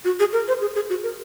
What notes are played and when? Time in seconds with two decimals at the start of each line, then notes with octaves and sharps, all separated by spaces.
0.04 F#4
0.20 G#4
0.33 A#4
0.48 C5
0.61 G#4
0.75 G#4
0.90 F#4
1.03 A#4